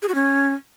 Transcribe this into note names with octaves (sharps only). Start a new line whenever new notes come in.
G#4
F#4
C#4